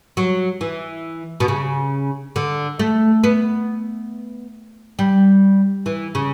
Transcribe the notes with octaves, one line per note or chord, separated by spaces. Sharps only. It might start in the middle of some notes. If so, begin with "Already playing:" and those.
F#3
E3
B2
C#3
D3
A3
B3
G3
E3
C#3